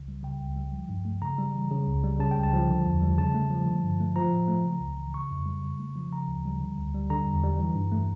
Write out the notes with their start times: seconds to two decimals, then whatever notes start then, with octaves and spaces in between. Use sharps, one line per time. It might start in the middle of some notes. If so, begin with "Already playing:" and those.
Already playing: C#2 C#3
0.08 G3
0.23 C#3 G5
0.40 C#2
0.56 G3
0.73 F3
0.89 G2
1.05 A3
1.22 C#3 A#5
1.39 G3
1.55 E3
1.71 C#3
1.87 C#2
2.04 G3
2.19 C#3 A5
2.31 G5
2.37 C#2
2.43 A5
2.53 F3
2.68 D3
2.86 E2
3.02 G3
3.18 C#3 A5
3.34 A3
3.50 F3
3.68 D3
3.83 G2
4.00 A3
4.16 F3 A#5
4.32 A2
4.48 A3
4.65 C#3
4.81 C#2
4.98 E3
5.14 C#3 C#6
5.31 F2
5.46 G3
5.64 C#3
5.80 A3
5.96 F3
6.12 C#3 A#5
6.28 D2
6.45 G3
6.60 D3
6.78 D2
6.94 G3
7.10 D3 A#5
7.26 E2
7.43 G3
7.58 E3
7.75 G2
7.92 A3